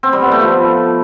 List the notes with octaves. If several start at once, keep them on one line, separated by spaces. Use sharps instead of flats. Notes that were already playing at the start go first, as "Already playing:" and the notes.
C4
G3
B3
A3
F3